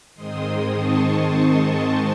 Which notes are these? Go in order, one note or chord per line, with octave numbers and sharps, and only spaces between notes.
G#2 D#3 G#3 C4 C6 D#6
A5 C#6
A5 C#6